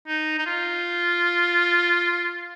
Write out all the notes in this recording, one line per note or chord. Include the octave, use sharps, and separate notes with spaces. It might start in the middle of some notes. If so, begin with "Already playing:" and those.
D#4
D#4
F4